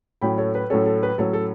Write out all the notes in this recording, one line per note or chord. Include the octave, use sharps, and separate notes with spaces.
A2 F#3 C#4 G5 B5
A4 C#5
B4
A2 F#3 C#4 A4
A4
B4
A2 F#3 C#4 A4 C#5
A4